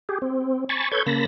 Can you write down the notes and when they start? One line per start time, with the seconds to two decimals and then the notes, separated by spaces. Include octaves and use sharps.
0.09 G4 G#4
0.22 C4
0.69 G#5 A5 B5 C#6 A6
0.91 A4 B4 C#5 G6 G#6
1.06 C#3 A#3 A5 B5 A#6